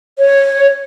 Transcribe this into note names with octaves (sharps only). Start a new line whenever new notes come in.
C#5